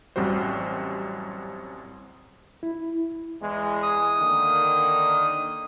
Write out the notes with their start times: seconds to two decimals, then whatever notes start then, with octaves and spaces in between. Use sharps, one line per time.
0.16 A1 F#2 G3 C4 F#4 C5
2.63 E4
3.41 E2 G#3
3.83 D#6
4.19 D3 D#3 A#3